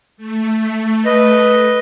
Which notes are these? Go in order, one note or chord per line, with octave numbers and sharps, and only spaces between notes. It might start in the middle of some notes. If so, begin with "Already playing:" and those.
A3
B4 D#5